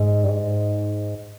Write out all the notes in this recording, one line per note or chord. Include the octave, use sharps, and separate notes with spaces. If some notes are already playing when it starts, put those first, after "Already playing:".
Already playing: G#2
G2
G#2